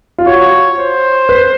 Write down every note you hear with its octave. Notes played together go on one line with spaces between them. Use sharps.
F4
F#4 C#5
C5
B4